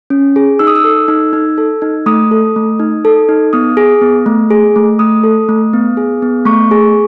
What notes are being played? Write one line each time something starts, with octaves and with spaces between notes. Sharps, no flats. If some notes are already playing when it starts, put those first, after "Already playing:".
C#4
G#4
D#4 E6
D#6
E6
A4
D#4
D#4
A4
D#4
A3 D#6
A4
A3
D#4
A4
D#4
B3 D#6
G#4
B3
A3
G#4
A3
A3 D#6
A4
A3
B3
G#4
B3
A3 C#6
G#4